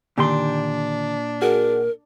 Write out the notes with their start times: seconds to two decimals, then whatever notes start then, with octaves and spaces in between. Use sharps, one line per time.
0.18 A#2 D3 D#3 D4 G4 C6
1.42 F#4 G#4 A#4 F#5